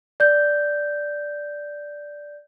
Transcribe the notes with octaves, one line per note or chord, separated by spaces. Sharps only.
D5 G6